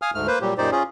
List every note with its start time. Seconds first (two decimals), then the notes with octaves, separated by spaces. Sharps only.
0.02 F5 G#5 D#6 F6
0.15 D2 G#2 A3 F6
0.27 A#3 B4 C5
0.41 A#2 F#3 G3 G4
0.58 F#2 A#2 D#4 G4 C5 D5
0.72 C#4 F4 G#4